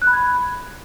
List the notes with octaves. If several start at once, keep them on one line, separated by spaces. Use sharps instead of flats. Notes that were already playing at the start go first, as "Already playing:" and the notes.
F#6
B5
G#6
B5